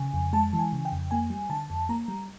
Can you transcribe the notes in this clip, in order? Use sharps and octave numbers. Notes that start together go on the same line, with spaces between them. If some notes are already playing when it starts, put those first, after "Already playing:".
Already playing: C#3 G#5
F2
G#3 A5
E3
G#5
C#3
G5
F2
A#3 G#5
G3
D3 A5
F2
A#3 A#5
G3